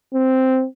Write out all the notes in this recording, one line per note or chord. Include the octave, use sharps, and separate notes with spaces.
C4